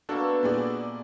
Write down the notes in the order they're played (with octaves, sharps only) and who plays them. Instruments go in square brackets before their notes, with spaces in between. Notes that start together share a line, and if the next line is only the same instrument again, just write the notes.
[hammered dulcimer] B2 A3 A#3 [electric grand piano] D4 F#4 A4
[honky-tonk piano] A#2 G#4 D5